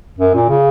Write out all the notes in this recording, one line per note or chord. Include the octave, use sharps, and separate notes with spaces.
F#2
A#2
C#3